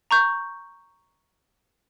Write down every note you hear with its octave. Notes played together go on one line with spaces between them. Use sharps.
A#5 C#6 G6